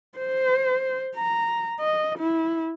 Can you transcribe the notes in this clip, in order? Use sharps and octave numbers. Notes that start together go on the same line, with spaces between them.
C5
A#5
D#5
E4